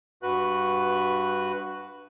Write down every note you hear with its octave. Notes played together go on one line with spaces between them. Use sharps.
G2 F#4 B4 F#6